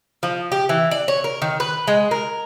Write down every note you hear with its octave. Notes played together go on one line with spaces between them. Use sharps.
F3
G4
E3
D5
C#5
A#4
D#3
B4
G#3
A#4